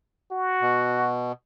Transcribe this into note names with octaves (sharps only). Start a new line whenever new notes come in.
F#4
B2